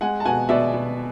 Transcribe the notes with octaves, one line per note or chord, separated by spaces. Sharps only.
G#3 F#5 G#5
A5
B2 F#5 G#5
B2 D5 E5
B2